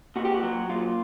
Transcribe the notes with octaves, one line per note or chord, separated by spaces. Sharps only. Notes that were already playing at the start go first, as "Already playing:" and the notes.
A#2 F#4
G4
F#4
F#3
A#2 F4